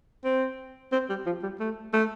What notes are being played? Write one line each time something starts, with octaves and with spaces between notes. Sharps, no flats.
C4
C4
G3
F3
G3
A3
A3